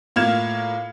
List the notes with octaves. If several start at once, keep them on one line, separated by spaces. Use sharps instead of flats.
A2 A#3 F4 F6 G#6 E7